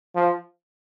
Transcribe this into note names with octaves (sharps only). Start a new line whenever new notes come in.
F3